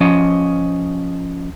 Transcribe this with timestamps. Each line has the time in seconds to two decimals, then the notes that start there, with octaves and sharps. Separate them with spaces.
0.01 F3 C#4 D#5